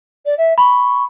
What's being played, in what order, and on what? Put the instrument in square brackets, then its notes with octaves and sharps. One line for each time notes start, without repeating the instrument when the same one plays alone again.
[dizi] D5
E5
[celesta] B5 [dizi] C#6